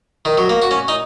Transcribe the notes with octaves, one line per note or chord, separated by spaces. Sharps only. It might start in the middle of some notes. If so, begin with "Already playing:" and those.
D#3
F#3
A#3
F#4
C#4
D#4